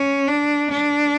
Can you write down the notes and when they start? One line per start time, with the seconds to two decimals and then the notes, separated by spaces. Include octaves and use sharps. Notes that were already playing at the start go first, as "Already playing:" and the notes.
Already playing: C#4
0.28 D4
0.70 D4